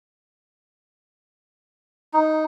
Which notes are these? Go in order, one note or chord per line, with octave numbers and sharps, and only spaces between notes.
D#4